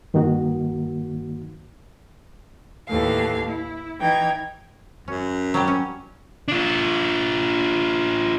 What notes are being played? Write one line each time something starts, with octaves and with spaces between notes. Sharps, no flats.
G2 D#3 A#3 D#4 F#4
D#2 A2 E3 A3 F5
E4
E3 D#4 G5 G#6
F#2 C#4
F#3 G3 G4
C#4
D4 F4